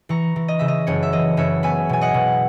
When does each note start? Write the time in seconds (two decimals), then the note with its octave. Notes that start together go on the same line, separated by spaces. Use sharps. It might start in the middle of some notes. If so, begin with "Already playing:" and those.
0.09 E3 A#5 C#6
0.36 E3
0.48 D#5
0.59 C#3 E5
0.68 D#5
0.87 F#1 C#5
1.03 E5
1.13 E3 D#5
1.37 F#1 C#5 E5
1.63 B3 E5 G#5
1.89 B2 G#5
2.01 D#5 F#5
2.14 B2